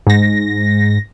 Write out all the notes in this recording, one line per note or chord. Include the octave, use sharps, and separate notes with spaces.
G#2 A#6